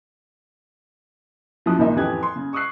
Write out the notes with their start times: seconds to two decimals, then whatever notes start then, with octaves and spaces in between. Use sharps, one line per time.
1.66 F#2 F3 F#3 E4 D#6 F#6
1.79 C#2 A#2 D#3 D#4 E5
1.95 A1 F2 E3 G4 F#6 G#6
2.23 C6
2.36 C#3
2.53 C#6 D#6 E6 F#6 C7